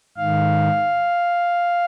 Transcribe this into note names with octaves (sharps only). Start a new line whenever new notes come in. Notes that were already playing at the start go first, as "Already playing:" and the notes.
G#2 D#3 F5